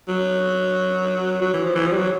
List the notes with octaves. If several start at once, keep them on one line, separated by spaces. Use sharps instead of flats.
F#3
F#3
E3
F3
E3
F3
G3
F#3